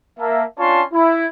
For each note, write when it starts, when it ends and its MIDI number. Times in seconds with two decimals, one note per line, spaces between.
0.19 0.43 58
0.19 0.43 76
0.19 0.43 81
0.58 0.83 61
0.58 0.83 62
0.58 0.83 65
0.58 0.83 73
0.58 0.83 81
0.58 0.83 84
0.93 1.26 64